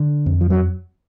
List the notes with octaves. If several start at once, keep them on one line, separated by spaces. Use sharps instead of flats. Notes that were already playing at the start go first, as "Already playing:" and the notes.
Already playing: D3
F2
F3
F#3